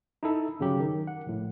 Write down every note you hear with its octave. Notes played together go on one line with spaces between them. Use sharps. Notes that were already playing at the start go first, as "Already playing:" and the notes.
D#4 E4 A4
G1 C#3 F#3 G4
D#3
F#5
A#1 A2